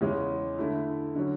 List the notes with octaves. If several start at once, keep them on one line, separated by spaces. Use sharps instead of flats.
E2 C#3 G#3 C#4
D3 A3 E4
D3 F#3 C#4